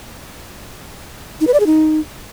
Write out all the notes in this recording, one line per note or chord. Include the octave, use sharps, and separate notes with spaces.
D#4
B4
D5
G#4
D#4